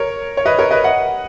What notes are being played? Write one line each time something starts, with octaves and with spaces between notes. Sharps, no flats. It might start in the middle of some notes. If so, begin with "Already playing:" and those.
Already playing: A#4 C#5
C#5
B4 D#5
A#4 C#5
B4 D#5
D#5 F#5